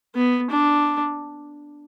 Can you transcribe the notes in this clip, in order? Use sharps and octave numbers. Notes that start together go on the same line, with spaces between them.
B3
D4